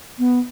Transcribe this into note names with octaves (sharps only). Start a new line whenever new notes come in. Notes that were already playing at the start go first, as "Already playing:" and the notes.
B3